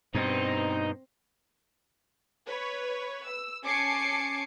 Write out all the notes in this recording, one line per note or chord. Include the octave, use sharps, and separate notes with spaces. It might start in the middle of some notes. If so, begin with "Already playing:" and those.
G2 B2 C4 D#4
B4 C#5
E6
C#4 G#5 A5 D6 C7 C#7